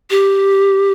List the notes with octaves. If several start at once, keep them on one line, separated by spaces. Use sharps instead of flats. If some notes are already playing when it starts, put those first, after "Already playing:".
G4